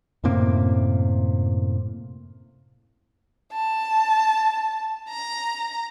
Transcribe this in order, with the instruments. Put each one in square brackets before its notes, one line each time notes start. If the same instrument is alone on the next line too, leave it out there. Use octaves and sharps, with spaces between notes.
[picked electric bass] F#2 A2 C3 A#3
[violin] A5
A#5